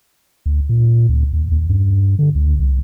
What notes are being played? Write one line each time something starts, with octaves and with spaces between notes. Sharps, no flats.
D2
A#2
D2
D#2
D#2
G2
D3
D2
C2